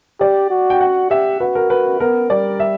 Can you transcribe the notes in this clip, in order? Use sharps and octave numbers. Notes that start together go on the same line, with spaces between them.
G4 D5
F#4
G5
F#5
G4 E5
F#4 B4
A#4
B4
B3 A#4
G3 D5
E5